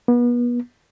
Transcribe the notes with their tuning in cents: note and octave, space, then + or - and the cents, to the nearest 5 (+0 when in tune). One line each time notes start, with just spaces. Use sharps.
B3 -35